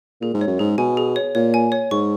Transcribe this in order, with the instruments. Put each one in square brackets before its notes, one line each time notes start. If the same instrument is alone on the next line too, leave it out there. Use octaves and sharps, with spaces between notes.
[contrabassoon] A#2 [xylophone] G#4
[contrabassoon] G#2
[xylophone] C#5
[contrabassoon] F#2
[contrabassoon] G#2 [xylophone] G#4
[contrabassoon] B2 [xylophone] G#5
[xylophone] G#4
C#5
[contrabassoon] A#2 [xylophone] C#5
[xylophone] G#5
C#5
[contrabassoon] G#2 [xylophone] C#6